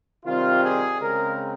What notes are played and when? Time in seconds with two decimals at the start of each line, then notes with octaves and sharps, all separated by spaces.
0.25 C3 D#3 G3 C4 F4
0.62 G#4
1.00 C#3 G#3 C4 A#4